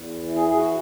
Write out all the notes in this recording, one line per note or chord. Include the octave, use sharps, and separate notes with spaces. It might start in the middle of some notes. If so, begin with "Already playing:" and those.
Already playing: E2
E3
G#4
G#4
F#4